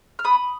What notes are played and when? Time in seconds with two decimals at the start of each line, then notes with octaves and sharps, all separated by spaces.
0.19 F6
0.24 B3 B5 D#6